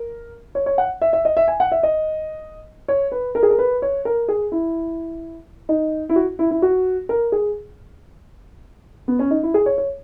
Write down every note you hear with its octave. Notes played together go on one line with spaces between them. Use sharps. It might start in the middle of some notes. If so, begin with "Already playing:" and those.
Already playing: A#4
C#5
C#5
F#5
E5
E5
D#5
E5
G#5
F#5
E5
D#5
C#5
B4
A#4
G#4
A#4
B4
C#5
A#4
G#4
E4
D#4
E4
F#4
E4
E4
F#4
A#4
G#4
B3
C#4
D#4
E4
G#4
C#5
C#5